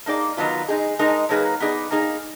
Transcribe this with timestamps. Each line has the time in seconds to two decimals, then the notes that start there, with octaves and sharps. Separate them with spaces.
0.06 A#3 D#4 G#4 D5
0.37 D#3 F#3 B3 F4
0.68 G#3 D#4 G#4
0.99 G#3 D#4 A#4 D#5
1.29 F#3 A#3 D#4 G#4 B4
1.60 B3 D#4 G#4 D5
1.91 A#3 D#4 G#4